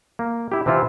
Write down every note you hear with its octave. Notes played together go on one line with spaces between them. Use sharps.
A#3
E4 G4
C3 E3 C4 E4 F4